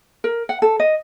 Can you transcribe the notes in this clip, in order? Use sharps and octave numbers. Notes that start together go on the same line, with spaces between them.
A#4
F#5
A4
D#5